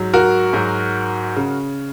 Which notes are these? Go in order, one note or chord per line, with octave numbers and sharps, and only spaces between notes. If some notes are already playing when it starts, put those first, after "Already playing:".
Already playing: G#2 F#3
F#4 A#4
G#2 F#3
C#3